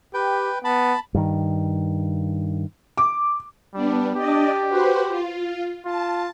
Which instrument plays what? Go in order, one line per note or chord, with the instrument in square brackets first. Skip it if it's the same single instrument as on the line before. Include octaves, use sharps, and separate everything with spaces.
[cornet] G4 [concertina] B4 G5
[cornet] B3 [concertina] A5 B5
[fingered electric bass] G2 D#3
[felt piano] D6
[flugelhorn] G3 [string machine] B3 D4
[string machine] D4 D5 D#5 [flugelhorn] G4
[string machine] F#4 B4 C5
F4
[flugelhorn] F4 [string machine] A5